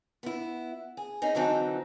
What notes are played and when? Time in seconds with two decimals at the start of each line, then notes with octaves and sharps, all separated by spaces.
0.23 B3 E4
0.97 G#4
1.22 C4 C#4 D#4 G#4
1.35 D3 E3 F#3 C4 D#4